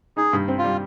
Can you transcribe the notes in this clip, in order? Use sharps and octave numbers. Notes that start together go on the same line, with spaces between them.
D#4 G#4
G2
C4
F4
G3